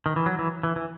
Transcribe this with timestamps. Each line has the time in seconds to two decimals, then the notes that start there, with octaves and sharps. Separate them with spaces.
0.06 D#3
0.16 E3
0.26 F#3
0.39 E3
0.63 E3
0.76 E3